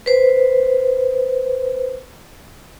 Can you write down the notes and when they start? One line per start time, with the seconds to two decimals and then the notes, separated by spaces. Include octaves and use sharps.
0.06 B4 C5